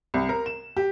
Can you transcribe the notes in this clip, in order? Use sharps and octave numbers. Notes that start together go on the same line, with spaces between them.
C2
A#4
E7
G4